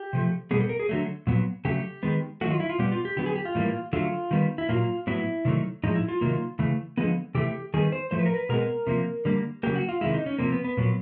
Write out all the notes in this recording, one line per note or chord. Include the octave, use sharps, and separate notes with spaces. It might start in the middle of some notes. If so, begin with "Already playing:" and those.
Already playing: G4
C3 F3 A3
B2 G3 B3 G#4
A4
A#4
G#4
D3 F#3 A3
A#2 F#3 B3
C#3 F#3 A3 G4
D#3 G#3 B3
D#3 F#3 A3 F#4
F4
E4
F4
B2 G3 B3 G4
F4
G4
D3 F#3 B3 G4
G#4
G4
F4
A2 E3 G3 A#3
D3 F#3 A3 F4
D#3 G3 B3
E4
A#2 F#3 A#3 F4
A2 F#3 B3 E4
C3 D#3 F#3 A3
A2 F3 G#3 D#4
E4
F4
C3 D#3 F#3 A#3
C#3 E3 A3
D3 F3 G#3 B3
C3 E3 A3 G4
D#3 G3 B3 G#4
C5
A2 F3 A3 C5
B4
A#4
B4
B2 G#3 B3 A#4
C3 F3 A#3
D3 G3 A#3
C#3 F#3 A#3 G4
F#4
F4
C3 D#3 G#3 E4
D#4
C#4
C3 F3 A#3 C4
B3
B3
A#2 F#3 B3